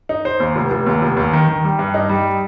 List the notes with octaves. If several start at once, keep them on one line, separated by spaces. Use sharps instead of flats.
D#4
C5
D#2
F1
F1
D#2
F1
D#2
D#3
D#3
G3
G2
D#4
G3